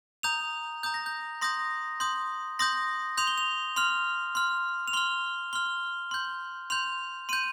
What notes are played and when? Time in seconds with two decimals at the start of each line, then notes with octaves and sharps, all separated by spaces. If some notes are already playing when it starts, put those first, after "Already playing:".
0.23 A#5 D#6 G6 F7
0.83 A#5 D#6 G6
0.94 A#6
1.06 G6
1.41 C6 D#6 G6 A#6
2.00 C6 D#6 G6
2.59 C6 D#6 G6 A#6
3.17 C6 D#6 G6 F7
3.27 G7
3.38 F7
3.76 C6 F6 F7
4.35 C6 F6
4.88 F7
4.93 C6 F6 G7
5.53 C6 F6 G7
6.11 C6 G6
6.70 C6 G6 F7
7.29 C6 G6 D#7